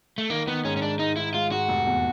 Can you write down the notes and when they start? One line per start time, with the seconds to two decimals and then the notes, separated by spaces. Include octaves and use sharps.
0.18 A3
0.30 D#3 A#3
0.47 D#3 B3
0.64 G#2 C#4
0.77 C#4
0.82 G#2 D4
0.99 G#2 D#4
1.16 G#3 E4
1.34 G#3 F4
1.51 G#2 F#4
1.68 F1
1.86 E2